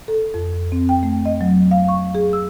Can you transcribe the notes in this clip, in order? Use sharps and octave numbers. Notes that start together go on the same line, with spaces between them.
A4
F2
C4
G5
A3
D#5
F#3
F5
C#6
G#4
E6